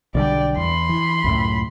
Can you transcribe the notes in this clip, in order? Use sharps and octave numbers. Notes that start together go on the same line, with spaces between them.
B1 D3 G3 D5 G5
E2 B5 C6
E3
C#2 F#2 A2